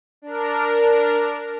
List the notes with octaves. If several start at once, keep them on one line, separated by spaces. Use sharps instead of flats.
D4 A#4